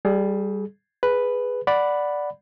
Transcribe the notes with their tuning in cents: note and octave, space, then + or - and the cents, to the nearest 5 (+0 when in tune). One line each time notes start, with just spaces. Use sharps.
G3 +0 G#4 +35
G#4 +0 B4 +0
D5 +0 F#5 -5 B5 +0